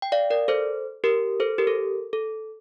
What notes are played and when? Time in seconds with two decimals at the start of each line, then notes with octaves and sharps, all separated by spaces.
0.02 G5
0.12 D5 F5
0.30 A#4 D5
0.48 A4 C5
1.04 G4 A#4
1.40 A4 C5
1.58 G4 A#4
1.67 A4
2.13 A4